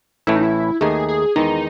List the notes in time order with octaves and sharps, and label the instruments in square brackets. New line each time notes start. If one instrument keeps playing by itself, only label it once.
[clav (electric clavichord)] A1 A2 E3 A3 [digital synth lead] E4
[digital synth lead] D#4
E4
[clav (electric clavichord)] D#2 D#3 A3 D#4 [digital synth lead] G#4
[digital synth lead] G#4
[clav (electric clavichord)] E2 D#3 G#3 [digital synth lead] D#4